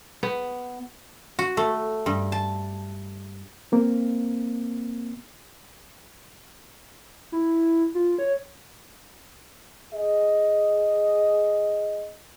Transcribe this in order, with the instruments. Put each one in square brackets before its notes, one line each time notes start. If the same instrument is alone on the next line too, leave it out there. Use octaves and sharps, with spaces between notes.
[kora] B3
[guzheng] F#4
A3
G2
A5
[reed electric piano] A#3 C4
[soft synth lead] E4
F4
C#5
[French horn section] G#4 D#5